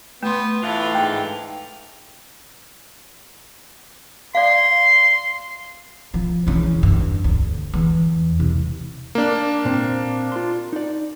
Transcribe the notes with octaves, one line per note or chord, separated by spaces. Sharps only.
A3 B3 C6
A2 D3 E3 F4
G#2 G5
D5 F5 C6
F3
E2 C#3
G2
D2
E2
C2
A#3 D4
A#2 C4
F4 C6
D#4 D5